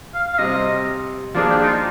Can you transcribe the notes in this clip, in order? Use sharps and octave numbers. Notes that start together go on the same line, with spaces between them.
F5
F5
C3 G3 C4 D#5
F3 A#3 D4 G#4 D5
G4
D#4
F4